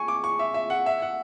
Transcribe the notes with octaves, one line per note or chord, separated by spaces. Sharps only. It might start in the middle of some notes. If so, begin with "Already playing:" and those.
Already playing: G#5 C#6
D6
C#6
E5
E5
F#5
E5
F#5